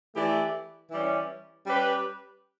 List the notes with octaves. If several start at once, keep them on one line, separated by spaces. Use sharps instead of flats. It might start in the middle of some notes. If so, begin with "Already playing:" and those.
E3 A3 E4 G4 D5
E3 G3 C#4
G3 C#4 G4 B4